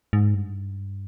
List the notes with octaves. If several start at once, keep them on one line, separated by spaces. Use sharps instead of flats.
G#2
G2